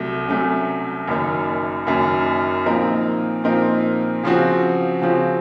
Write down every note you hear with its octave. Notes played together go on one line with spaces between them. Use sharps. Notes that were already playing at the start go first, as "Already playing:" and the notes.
Already playing: C2 C3 F#3 A3
C2 C3 F#3 A3 C#4
F#1 F#2 D#3
F#1 F#2 D#3
A#2 F3 C4 D#4 A#4
A#2 F3 C4 D#4 A#4
C#3 F3 C4 F#4
C#3 F3 C4 F#4